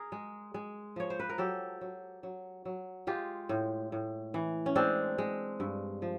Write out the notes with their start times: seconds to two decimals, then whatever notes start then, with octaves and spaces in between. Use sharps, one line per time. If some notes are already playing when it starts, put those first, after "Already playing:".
Already playing: G#4 A#4
0.12 G#3
0.54 G#3
0.96 F3 C#5
1.10 C5
1.20 B4
1.29 A#4
1.38 F#3 G4 A4
1.81 F#3
2.23 F#3
2.65 F#3
3.07 G#3 F4 G4
3.49 A2
3.92 A2
4.34 E3
4.66 C#4
4.76 G#3 C4 D4
5.18 G#3
5.60 G2
6.02 F3